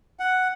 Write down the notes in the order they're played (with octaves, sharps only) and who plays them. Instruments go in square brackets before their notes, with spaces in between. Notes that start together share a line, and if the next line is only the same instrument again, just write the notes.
[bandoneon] F#5